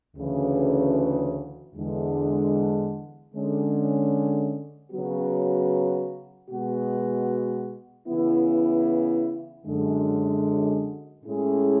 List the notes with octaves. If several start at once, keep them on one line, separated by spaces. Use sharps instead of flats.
D2 C#3 E3
E2 D3 G#3
D3 G#3 C#4
C#3 F#3 B3 F#4
B2 G#3 B3 F#4
C#3 E3 B3 E4
F#2 D3 G#3
A2 G#3 C#4 E4 G#4